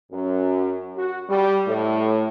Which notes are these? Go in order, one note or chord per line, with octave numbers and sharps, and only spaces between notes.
F#2
F#4
G3
A2